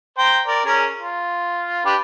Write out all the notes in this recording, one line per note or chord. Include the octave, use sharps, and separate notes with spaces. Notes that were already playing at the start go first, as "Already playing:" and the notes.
C5 G5 A#5
A#4 D5
C#4 G#4 A#4
F4
D4 G4 B4